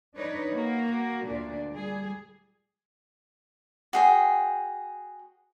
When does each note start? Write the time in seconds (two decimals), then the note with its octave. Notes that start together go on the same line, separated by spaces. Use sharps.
0.17 D4 D#4 B4 C#5
0.50 A#3 F#4
1.25 D2 A#2 D4
1.71 G3 G#4
3.93 F#4 G#4 G5